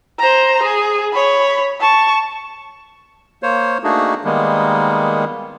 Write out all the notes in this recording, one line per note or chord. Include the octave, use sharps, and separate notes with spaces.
C5 A#5
G#4
C#5 B5
A5 C#6
A#3 C5 C#5
A3 A#3 D4 D#4 F#4 G#4
D#3 G3 G#3 A#3 B3